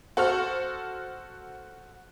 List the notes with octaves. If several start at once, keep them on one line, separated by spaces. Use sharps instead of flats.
F#4 A4 C5 C#6 F6